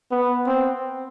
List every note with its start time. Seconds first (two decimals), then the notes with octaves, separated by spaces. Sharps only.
0.11 B3
0.47 C4